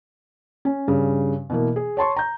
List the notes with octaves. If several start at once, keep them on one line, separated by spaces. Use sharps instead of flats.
C#4
G2 C#3
B2 E3 A#3
G#4
C#5 A5 C6 C#6
A#5 G6